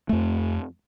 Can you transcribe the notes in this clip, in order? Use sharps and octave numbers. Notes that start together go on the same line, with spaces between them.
F2 A3